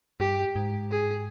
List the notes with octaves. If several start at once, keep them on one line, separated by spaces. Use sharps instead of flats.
G2 G4
G#2
G#4